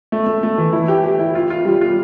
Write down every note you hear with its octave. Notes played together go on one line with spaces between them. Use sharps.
A3
A3
A3
E3
E4
G4
G4
E4
F4
F4
G3
F4